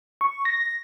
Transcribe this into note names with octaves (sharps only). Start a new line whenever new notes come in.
C#6
A#6